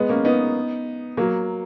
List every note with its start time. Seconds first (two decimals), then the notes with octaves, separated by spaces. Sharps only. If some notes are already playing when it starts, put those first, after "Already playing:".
Already playing: G#3 B3
0.09 A#3 C#4
0.25 B3 D#4
1.17 F#3 A#3